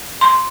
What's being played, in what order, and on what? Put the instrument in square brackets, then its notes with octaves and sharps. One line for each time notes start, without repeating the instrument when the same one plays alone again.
[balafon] C6